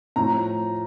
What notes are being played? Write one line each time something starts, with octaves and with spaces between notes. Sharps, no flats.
A2 F3 A#5